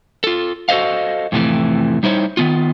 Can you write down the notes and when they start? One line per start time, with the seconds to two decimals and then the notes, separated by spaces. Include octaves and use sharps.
0.24 F4 A4
0.69 F#4 A4 C5 D#5 F5
1.32 F2 A2 C3 E3 A3
2.03 G3 D#4 E4 C5 C#5
2.37 D#3 B3 F4